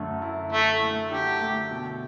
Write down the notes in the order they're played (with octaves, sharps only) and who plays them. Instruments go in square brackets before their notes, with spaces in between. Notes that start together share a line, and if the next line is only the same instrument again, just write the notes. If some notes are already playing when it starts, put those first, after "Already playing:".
Already playing: [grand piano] F#2 D3 A3
E4
[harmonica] A3 [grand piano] E4
[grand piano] A3
[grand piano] D3 [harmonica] G4
[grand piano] A3
B2